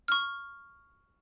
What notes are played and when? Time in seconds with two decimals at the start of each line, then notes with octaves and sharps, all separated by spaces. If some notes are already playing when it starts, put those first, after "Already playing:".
0.08 C#6 F6